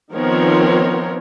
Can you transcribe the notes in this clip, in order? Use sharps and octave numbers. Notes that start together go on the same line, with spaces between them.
D#3 F3 B3 C4 A#4 C#5